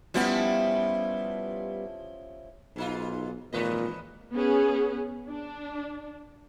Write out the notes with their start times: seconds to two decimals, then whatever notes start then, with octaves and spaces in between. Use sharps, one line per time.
0.14 F3 G3 B3 C#4 E4 G4
2.76 B1 G#2 D#4 F4
3.53 G#1 A#2 E3 B4 D#5
4.33 B3 C#4 G#4
5.30 D4